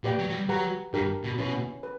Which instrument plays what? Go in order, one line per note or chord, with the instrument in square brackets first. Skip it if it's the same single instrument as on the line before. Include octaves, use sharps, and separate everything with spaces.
[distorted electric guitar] A#2 [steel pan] G4 B4 D5 G5
[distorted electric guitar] F#3
F#3
G3
[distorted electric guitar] F#3 [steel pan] G4 B4 F#5 A#5
[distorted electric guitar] G2 [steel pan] D4 G4 A#4
[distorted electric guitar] B2
[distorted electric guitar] B2 [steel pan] C#4 E4 B4
[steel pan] B4